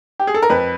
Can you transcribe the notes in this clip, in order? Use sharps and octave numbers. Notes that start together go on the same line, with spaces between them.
G4
G#4
A4
A#4
F2 B4